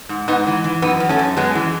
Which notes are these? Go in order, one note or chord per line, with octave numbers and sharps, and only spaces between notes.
G#2
G#2 B3 D#4
E3
E3
F#2 B3 D#4
F#2
A3 C#4
F#2
F#2 G#3 B3
E3